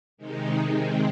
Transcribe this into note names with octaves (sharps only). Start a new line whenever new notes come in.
C3 D#3 G#3 D#4
C3 D#3 G#3 C4